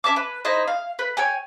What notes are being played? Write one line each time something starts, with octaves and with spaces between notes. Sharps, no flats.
C#4 E5 A5 D6
B4
D#4 E4 C5 D#5
F5
B4
C#5 G5 G#5